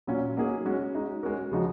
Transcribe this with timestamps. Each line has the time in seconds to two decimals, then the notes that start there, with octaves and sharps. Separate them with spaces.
0.07 A#2 F#3 C#4 F4
0.37 F#3 A#3 D#4 G#4
0.65 G#3 C#4 F#4
0.94 G#3 D#4 F#4
1.23 G#3 C#4 F#4 A#4
1.51 C#3 F3 G#3 D#4 F#4